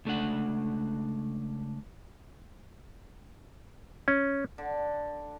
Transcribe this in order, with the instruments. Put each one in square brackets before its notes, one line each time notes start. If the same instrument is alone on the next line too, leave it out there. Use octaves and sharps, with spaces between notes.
[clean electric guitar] C#2 A3 D4 F#5
[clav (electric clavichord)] C#4
[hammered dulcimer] D3